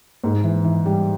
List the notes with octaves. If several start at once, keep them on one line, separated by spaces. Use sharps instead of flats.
G#2
E3
E3
G3